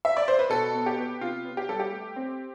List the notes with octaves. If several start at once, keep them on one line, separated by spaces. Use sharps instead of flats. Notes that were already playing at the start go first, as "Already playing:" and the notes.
E5
D5
C5
B4
B2 A4
B3
G4
B3
C3 F4
B3
G4
G3 A4
G4
A3
C4